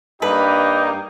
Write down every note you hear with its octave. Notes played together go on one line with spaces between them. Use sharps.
G2 G3 A#3 D#4 G4 B4